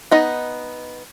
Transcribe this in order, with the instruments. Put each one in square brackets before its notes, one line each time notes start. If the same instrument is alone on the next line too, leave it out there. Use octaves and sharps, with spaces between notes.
[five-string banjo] B3 D#4 D#5